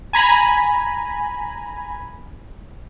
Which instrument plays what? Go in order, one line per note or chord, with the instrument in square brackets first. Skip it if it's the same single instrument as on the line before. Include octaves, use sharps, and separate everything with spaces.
[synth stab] G#5 A#5 B5